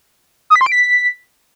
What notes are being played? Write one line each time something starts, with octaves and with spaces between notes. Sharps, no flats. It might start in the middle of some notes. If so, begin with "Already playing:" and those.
D#6
B6
C6
D7
B6